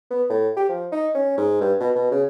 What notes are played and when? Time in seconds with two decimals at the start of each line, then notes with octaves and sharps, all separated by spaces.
0.10 B3
0.30 A2
0.57 G4
0.69 F3
0.92 D#4
1.15 C#4
1.38 G#2
1.61 G2
1.80 B2
1.95 B2
2.11 C#3